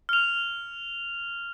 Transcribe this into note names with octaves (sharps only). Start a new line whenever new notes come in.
F6 F7